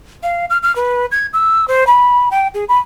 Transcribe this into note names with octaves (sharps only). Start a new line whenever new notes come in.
F5
F6
F6
B4
G#6
E6
C5
B5
G5
G#4
B5